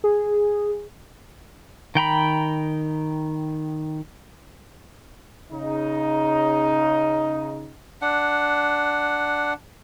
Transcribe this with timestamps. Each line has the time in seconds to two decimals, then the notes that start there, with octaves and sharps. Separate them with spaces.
0.04 G#4
1.95 D#3 G5 A#5 B5
5.52 C#3 D#4
8.02 D4 F#5